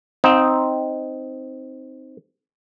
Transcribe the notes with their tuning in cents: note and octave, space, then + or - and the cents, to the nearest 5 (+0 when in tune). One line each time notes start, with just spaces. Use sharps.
C4 +0 D#4 +0 F5 +45